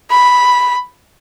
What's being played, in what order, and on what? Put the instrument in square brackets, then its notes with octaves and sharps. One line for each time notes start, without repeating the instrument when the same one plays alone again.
[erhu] B5